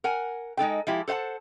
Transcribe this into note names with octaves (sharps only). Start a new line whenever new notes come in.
A#4 F#5 G#5
G#3 D#4 A4 G5
F3 G#3 E4 G4
A4 C5 F5 F#5 A5